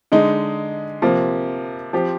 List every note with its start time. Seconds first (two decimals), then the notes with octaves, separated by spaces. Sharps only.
0.12 D3 G#3 D#4
1.02 C3 F3 A#3
1.93 F3 C4 G4